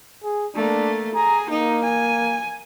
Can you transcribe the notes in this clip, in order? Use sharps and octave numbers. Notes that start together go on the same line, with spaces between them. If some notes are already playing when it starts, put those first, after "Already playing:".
G#4
A3 A#3 D4
G#4 A#5
A#3 D#4
G#5